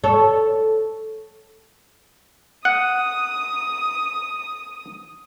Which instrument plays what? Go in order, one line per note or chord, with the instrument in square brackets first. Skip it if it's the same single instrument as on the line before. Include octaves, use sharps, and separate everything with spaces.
[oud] A4 C#5
[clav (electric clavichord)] F#5 [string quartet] D#6